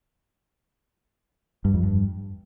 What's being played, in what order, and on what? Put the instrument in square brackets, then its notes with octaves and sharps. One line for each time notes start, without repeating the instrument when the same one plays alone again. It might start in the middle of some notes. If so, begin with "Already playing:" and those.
[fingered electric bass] G2
F2
G2